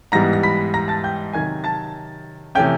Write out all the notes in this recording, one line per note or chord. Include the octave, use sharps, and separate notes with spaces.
G#2 E3 G3 B3 A#5 A#6
A#6
B5 B6
A#5 A#6
A5 A6
G5 G6
C3 D#3 F#3 G#5 G#6
A5 A6
C3 E3 A3 C#4 G5 G6